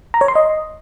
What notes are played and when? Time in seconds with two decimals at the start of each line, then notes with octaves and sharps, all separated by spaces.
0.14 A#5
0.21 C#5
0.28 C6
0.36 D#5